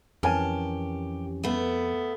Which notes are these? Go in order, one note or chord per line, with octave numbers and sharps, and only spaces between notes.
F2 E3 C#4 G4 A#4 G#5 A5
A3 B3